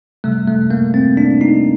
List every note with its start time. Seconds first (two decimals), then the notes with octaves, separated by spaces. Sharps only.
0.24 C3 G3 A3
0.48 A3
0.71 A#3
0.94 C4
1.17 D4
1.41 D#4